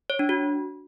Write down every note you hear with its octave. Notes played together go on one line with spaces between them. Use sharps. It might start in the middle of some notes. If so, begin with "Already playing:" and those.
C#5
D4
F#4